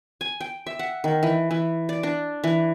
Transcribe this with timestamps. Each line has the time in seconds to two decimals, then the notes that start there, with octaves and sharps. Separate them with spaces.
0.21 G#5
0.41 G5
0.66 E5
0.79 F#5
1.04 D#3
1.23 E3
1.51 E3
1.89 D5
2.03 D4
2.44 E3